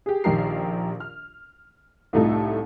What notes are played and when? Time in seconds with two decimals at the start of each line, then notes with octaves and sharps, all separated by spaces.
0.06 G4 G#4
0.24 A#1 D#3 G4 A#4 C7
1.00 F6
2.13 C2 A2 A3 D#4 F4 A4